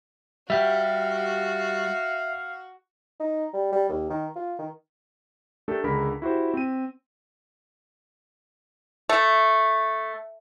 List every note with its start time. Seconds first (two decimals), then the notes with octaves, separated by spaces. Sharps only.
0.50 G3 F#4 G4 E5 F5
3.20 D#4
3.53 G3
3.72 G3
3.89 D#2
4.10 D#3
4.36 F4
4.59 D#3
5.68 A3 D4 G4 A4 A#4
5.84 C#2 D3 G#4 A#4 B5 B6
6.22 E4 F#4 G4 C5
6.54 C4 D#7
9.09 A3